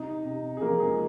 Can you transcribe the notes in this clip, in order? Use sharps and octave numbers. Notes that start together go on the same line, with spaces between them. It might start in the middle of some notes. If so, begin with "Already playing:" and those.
Already playing: C3 D#4 D#5
C3
G#4
F3 A#3 A#4
G#3 G#4